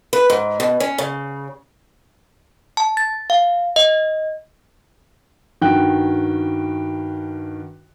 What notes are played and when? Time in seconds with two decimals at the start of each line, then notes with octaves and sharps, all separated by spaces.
0.13 B4
0.30 G#2
0.60 B2
0.80 C#4
0.98 C#3
2.77 A5
2.97 A6
3.30 F5
3.76 D#5
5.61 G2 D#3 F#4 G5 F#6